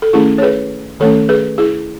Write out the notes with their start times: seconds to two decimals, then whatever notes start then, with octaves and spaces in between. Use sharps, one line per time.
0.02 A4
0.13 D#3 A3 C#4 E4 G#4
0.38 C#5
0.42 G#4 B4
1.00 D#3 A3 C#4 A4 C#5
1.29 G#4 B4
1.58 E4 G#4